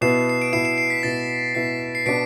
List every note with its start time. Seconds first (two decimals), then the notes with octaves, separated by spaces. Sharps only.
0.01 B2 B3 E4 C7 E7
0.30 C7
0.42 D7
0.53 B2 B3 E4 C7 E7
0.65 C7 E7
0.78 C7
0.90 B6
1.03 B2 B3 E4 A6
1.55 B2 B3 E4 B6
1.95 C7
2.06 B2 B3 D4 B6 D7